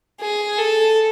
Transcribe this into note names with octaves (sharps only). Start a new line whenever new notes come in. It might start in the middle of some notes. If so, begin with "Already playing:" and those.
G#4
A4